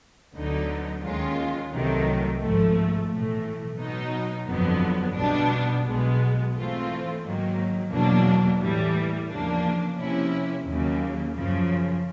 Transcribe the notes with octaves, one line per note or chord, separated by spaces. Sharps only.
D2 D3 F#3 B3 D#4
D#2 D#3 G#3 C#4 F4
C2 C3 D#3 F#3 A3
G#1 G#2 F3 A3
B1 A2 E3 A3
B2 F#3 B3 D#4
G1 F2 D3 F#3 B3
B1 B2 G3 B3 D4
B1 B2 G#3 B3
G#2 E3 A3 C4 F4
G#2 D#3 F#3 A#3
E2 B2 F#3 A#3 D4
A2 E3 G3
E2 C#3 F3 A#3 D4
C3 F3 A#3 C#4 E4
D#2 C#3 F#3 A#3
F#2 C#3 F3